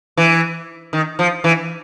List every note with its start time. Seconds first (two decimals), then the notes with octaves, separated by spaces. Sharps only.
0.17 E3
0.93 D#3
1.19 F3
1.44 E3